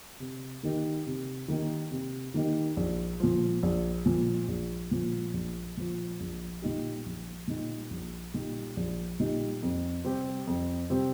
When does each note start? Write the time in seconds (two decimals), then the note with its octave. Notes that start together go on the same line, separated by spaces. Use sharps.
0.20 C3
0.63 D#3 A#3 D#4 G4
1.06 C3
1.48 D#3 A#3 D#4 G4
1.91 C3
2.34 D#3 A#3 D#4 G4
2.77 A#1
3.20 A#2 F3
3.63 A#1
4.06 A#2 F3
4.48 A#1
4.91 A#2 F3
5.33 A#1
5.77 A#2 F3
6.20 A#1
6.62 A#2 G3 D#4 G4
7.06 A#1
7.48 A#2 G3 D#4 G4
7.90 A#1
8.34 A#2 G3 D#4 G4
8.77 A#1
9.19 A#2 G3 D#4 G4
9.62 F2
10.04 C3 G3 C4 G4
10.47 F2
10.90 C3 G3 C4 G4